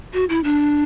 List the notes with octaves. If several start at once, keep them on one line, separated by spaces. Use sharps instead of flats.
F#4
E4
D4